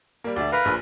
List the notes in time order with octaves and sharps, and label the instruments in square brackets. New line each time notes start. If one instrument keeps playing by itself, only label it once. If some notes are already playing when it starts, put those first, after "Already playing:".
[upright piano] G3 A#3
[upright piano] D2 E5 [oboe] D5
[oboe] A#4 [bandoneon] B4 [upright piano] F5
[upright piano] A#1 A#2